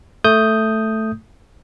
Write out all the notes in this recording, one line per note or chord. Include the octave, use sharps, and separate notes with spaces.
A3 D#6 G6